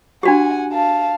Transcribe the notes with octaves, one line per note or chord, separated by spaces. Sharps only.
D4 F#4 G4 F#5 G#5
F5 A5